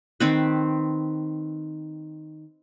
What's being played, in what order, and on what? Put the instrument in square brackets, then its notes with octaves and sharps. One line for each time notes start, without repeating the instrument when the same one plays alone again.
[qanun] D#3 C4 B4